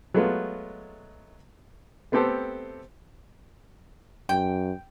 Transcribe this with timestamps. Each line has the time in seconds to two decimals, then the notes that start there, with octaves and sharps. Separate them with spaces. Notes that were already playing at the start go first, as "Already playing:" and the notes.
0.14 F#3 G#3 A3 B3 F4
2.12 A3 B3 C4 G4 A4 C5
4.29 F#2 G5